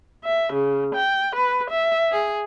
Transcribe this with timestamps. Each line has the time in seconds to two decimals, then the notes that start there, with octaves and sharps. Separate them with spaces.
0.24 E5
0.54 C#3
0.95 G5
1.35 B4
1.71 E5
2.11 G#4